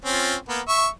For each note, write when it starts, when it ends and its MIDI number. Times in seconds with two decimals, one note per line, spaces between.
0.05 0.35 60
0.05 0.35 61
0.05 0.35 65
0.49 0.61 58
0.49 0.61 59
0.68 0.87 76
0.68 0.87 85